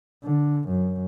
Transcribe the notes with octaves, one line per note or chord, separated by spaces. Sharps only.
D3
F#2